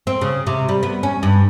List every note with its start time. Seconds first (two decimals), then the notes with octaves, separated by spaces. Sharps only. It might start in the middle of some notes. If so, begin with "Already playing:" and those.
0.07 C4
0.21 C#3
0.47 C3
0.69 G3
0.83 B3
1.03 C#4
1.23 G2